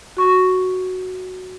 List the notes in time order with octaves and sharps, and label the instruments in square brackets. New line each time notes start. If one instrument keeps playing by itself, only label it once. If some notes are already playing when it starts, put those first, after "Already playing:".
[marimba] F#4 C#6